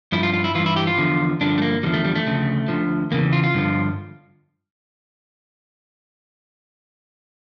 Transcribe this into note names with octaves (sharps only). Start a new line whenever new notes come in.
G2 F3 E4
F4
F4
E4
G2 E3 F4
E4
G4
F4
E2 D3 F3
G2 D3 F3 D4
A3
A#3
E2 D3 F3 G3
A3
G3
A3
D2 C#3 F3
D2 D3 F3
E2 C#3 E3 A#3
F4
F4
G2 D3 F3